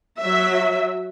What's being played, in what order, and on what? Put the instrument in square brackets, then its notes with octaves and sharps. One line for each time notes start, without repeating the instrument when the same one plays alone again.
[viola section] F#3 E5